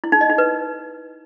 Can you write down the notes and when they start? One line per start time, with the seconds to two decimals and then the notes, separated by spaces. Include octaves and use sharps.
0.04 E4
0.12 D#4
0.21 D#5
0.30 D#4
0.38 B4